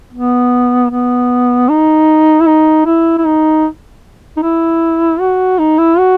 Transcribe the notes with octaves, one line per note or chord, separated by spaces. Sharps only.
B3
B3
D#4
E4
D#4
E4
E4
D#4
D#4
E4
F#4
D#4
E4
F#4